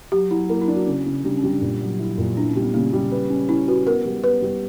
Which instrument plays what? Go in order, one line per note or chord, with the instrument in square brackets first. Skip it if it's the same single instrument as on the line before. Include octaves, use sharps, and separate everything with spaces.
[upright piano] F#3 [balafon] G4
[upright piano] F#3 [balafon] E4
[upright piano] A#3 [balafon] E4
[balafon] E4
[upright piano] D4
[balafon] F#4
[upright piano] C#3
C#3
[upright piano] G3 [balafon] D4
[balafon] C#4
[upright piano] G3
[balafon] D4
[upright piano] A#2 [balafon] D4
[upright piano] F#3
E4
A#2
[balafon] D4 [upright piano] E4
[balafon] C#4
[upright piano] G3
[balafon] B3
[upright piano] C#3 [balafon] A#3
[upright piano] G3
B4
C#4
[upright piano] C#4 [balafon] E4
[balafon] F#4 [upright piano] B4
[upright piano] B3 [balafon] A#4
[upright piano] G3
[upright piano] B3 [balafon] B4
[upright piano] G3